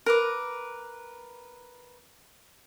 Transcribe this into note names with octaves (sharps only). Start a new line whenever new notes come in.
A#4 B4 D6